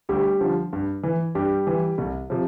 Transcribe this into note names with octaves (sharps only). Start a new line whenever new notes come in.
D2 G3 G4
D3 F3
G2
E3
G2 G3 G4
E3
C2
C3 F3